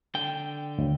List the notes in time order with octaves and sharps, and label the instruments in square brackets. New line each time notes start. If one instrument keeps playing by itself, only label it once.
[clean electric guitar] D3 G5
[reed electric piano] D2